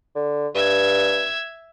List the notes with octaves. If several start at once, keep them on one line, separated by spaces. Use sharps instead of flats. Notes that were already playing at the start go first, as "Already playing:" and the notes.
D3
G2 E5 G#6